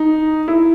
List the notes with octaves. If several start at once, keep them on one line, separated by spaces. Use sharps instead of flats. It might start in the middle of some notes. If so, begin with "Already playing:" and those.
Already playing: D#4
E4